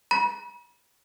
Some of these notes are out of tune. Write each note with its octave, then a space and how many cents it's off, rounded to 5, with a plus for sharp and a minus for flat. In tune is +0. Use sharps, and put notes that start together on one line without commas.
B5 -45